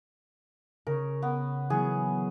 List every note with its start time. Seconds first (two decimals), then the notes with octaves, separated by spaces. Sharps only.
0.87 C#3 C#4 A#4
1.22 B3
1.70 E3 F#3 B3 G#4